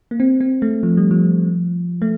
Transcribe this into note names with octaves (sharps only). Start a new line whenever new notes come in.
A#3
C4
C4
A3
F3
G3
F3
A3